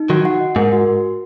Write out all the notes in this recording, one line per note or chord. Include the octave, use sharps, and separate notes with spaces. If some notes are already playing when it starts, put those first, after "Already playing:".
Already playing: D#4
D#3 F#3 F#4
F#5
D#5
G#2 A#4
F#4